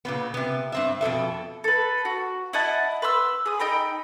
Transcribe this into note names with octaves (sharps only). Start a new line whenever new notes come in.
A#2 C#3 B3
C3 B3
G2 C4 E5
F2 B2 A4 E5
A4 B4
F#4
E4 D#5 F#5 A5
B4 C6 E6
G#4 D#6
D#4 D#5 G5 B5